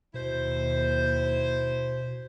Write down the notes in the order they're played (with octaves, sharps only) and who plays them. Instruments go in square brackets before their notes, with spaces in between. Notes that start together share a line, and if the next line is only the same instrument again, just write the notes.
[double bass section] D#2 [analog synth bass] B2 [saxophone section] E4 C5